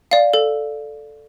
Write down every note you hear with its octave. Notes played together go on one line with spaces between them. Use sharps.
D5 F5
A4